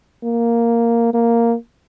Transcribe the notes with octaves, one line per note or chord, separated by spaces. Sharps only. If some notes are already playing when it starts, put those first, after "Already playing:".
A#3
A#3